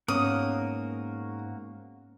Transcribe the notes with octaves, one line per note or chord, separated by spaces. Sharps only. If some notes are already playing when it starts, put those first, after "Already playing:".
G#2 A#3 B3 C#4 F#4 A#4 D#6